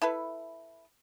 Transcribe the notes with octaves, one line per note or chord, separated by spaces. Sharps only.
E4 A4 B4